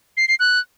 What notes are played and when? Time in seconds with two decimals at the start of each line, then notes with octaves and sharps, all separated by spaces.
0.17 C7
0.28 C7
0.39 F#6